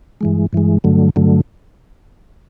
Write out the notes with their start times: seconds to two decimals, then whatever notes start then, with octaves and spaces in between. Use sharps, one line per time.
0.21 G2 E3 G#3
0.53 G2 E3 G#3
0.84 G2 D3 F#3 A3
1.16 G2 D3 F#3 A3